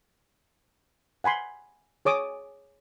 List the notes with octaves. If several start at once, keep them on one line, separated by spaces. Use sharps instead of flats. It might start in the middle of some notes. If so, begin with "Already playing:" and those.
F#5 G#5 B5 C6
G#4 C#5 D6 D#6